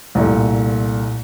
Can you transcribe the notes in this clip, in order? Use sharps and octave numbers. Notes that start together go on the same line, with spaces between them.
C2 A#2 A3